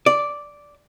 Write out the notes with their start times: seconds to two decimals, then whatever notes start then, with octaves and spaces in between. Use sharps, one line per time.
0.06 D5